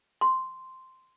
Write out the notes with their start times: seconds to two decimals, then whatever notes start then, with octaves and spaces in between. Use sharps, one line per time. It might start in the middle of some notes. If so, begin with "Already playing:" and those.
0.21 C6